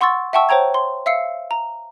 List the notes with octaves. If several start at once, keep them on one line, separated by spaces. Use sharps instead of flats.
F#5 C6 C#6 E6 A6
E5 F#5 G5 A5 C#6 E6
C5 C#5 G5 A#5 G#6
C6
E5 F5 E6 C7 C#7
A#5